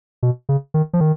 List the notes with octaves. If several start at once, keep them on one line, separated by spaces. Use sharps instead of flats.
B2
C#3
D#3
F3
D#3